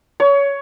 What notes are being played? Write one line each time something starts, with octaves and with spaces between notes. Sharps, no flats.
C#5